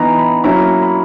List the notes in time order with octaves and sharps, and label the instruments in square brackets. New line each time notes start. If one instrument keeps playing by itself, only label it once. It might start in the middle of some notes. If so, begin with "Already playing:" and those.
Already playing: [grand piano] E3 B3 D#4 A#5
B5
F#3 A#3 C#4 E4 A#5
B5